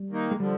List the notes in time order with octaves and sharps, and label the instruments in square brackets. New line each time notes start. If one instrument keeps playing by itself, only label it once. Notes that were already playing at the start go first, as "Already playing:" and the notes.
Already playing: [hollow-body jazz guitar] G3
[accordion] D#3 A#3 D#4
[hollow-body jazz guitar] G#3
[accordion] D3 F3 [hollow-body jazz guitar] G3